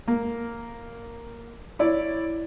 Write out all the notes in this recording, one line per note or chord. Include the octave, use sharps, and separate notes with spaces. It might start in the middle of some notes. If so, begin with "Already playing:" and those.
A#3
E4 C#5 D5